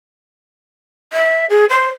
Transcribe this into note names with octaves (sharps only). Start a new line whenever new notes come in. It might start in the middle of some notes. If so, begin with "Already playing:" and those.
E5
G#4
C5